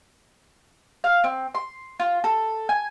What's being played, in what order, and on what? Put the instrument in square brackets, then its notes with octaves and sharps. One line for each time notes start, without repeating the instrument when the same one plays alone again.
[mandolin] F5
C4
C6
F4
A4
G#5